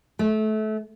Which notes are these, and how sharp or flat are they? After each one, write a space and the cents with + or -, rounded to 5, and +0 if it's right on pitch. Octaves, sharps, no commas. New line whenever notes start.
A3 -25